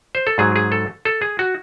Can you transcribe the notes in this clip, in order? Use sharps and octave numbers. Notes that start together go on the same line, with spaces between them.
C5
A4
G#2 F#3 G#4
G#4
A4
A4
G#4
F#4